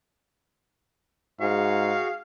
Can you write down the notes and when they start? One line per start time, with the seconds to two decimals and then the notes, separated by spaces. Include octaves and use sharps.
1.40 G#2 F#4 G#4 F5 C#6